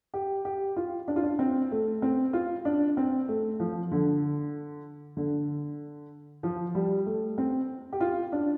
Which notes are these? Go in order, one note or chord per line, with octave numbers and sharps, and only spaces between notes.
G4
G4
F4
D4
F4
D4
C4
A3
C4
F4
D4
C4
A3
F3
D3
D3
F3
G3
A3
C4
G4
F4
D4